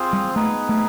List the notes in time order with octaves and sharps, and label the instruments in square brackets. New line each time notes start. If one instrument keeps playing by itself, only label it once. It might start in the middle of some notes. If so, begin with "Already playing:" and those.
Already playing: [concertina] C4 F4 G#4 C5
[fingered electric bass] G3
[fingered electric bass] A3 [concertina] B3 D#4 G#4 B4
[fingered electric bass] A3